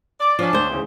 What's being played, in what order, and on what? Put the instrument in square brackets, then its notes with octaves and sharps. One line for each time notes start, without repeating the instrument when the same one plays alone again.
[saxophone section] D5
[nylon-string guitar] F3 [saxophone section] C#4 D4
[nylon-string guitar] D2 C5
[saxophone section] E2 G#2 C#3